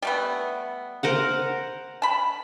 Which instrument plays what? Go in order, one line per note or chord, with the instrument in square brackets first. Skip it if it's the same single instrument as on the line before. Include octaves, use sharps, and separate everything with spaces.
[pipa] G3 A3 B3
[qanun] A#4 C5 F#5
[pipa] A5 B5